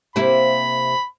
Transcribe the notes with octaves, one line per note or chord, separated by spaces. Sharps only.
C3 A#3 E4 B5